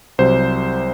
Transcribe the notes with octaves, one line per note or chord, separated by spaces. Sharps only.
C2 C3 F#3 C5